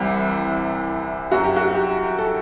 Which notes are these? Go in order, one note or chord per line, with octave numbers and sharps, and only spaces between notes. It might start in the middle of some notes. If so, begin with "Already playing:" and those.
Already playing: C2 C3 E3 G3
F#2 F#3 F#4
G4
F#4
G4
A4